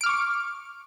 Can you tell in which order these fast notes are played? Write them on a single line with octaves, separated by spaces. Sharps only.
D7 F6 D6 C#6